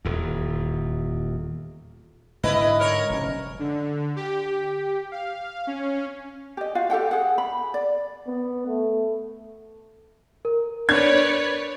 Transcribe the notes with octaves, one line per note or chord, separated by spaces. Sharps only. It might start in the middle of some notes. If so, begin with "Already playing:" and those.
D#1 E2
G#2 D3 G#3 E4 B4 D#5
A#4 C#5
F1 G3 C#4
D3
G4
F5
C#4
G4 D#5
F4 F#4 F5
G4 A4 F#5 G5
G#4 F#5
B5
D5
B3
A3
A#4
D4 B4 C#5 D5 G#6